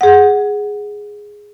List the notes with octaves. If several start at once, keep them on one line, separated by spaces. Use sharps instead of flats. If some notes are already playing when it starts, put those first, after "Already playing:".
G#4 F#5